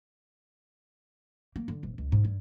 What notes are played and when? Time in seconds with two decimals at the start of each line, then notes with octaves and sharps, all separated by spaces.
1.56 A#3
1.68 D3
1.83 D#1
1.98 C#2
2.12 G#2
2.25 G2